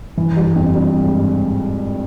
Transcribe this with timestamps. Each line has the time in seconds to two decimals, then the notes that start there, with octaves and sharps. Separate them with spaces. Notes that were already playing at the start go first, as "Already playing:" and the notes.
0.18 E3
0.37 G2
0.56 F2
0.75 G2
1.04 G#2